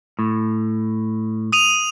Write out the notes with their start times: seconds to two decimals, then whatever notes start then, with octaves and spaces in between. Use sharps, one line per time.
0.19 A2
1.52 D#6 D#7 F7